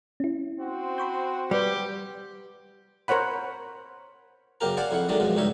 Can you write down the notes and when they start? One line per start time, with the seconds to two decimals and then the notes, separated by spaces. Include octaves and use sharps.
0.20 C#4 E4
0.60 C4 F#4 C5
0.98 B5 C#6 G6
1.51 G3 G4 B4 G5
3.08 A#4 C5 C#5 F#5 B5
4.61 F#2 C#3 A#3 G4 A#4 A#5
4.77 C5 D5 F5 F#5 G#5
4.91 F2 E4 F#5
5.09 D#3 F#3 G#3 A3 D4
5.20 F#2 B2 F3 G#3
5.36 C#2 G2 D#4 C#5 E5